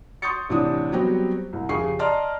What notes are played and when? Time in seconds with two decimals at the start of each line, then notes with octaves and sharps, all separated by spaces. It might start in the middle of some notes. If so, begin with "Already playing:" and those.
0.22 C6 C#6 D#6 G6 A6 C#7
0.49 A1 C3 E3 D4 D#6
0.92 F#3 G3 B3 C4 F#4 G4
1.53 C2
1.69 F2 C#3 G4 G#4 C#6 C7
1.99 D5 D#5 A5 A#5 C6 F6